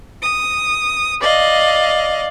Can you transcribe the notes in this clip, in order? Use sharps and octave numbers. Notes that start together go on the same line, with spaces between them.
D#6
D5 D#5 F5